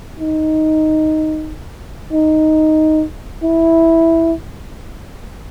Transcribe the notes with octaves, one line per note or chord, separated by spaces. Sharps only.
D#4
D#4
E4